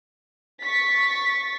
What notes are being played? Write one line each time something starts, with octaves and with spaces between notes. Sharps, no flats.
C#6 A6 B6